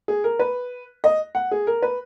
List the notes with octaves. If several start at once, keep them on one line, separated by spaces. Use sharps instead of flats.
G#4
A#4
B4
D#5
F#5
G#4
A#4
B4